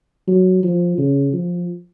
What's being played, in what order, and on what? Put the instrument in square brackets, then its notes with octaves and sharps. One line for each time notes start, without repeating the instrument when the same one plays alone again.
[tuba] F#3
F3
C#3
F3